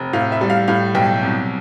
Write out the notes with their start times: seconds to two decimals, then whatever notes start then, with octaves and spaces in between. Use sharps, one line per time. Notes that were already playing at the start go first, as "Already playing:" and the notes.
Already playing: F1
0.13 A2 F5
0.32 E5
0.41 G3
0.50 F5
0.68 A2 F5
0.95 B1 G5
1.22 C2